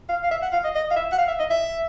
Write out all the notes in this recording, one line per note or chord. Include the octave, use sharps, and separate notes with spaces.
F5
F5
E5
F#5
F5
D#5
D#5
F5
E5
F#5
F5
E5
D#5
E5